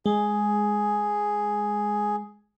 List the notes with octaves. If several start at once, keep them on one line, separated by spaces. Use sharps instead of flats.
G#3 G#4